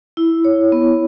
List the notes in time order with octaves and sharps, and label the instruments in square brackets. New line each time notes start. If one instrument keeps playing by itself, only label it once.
[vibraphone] E4
C#5
B3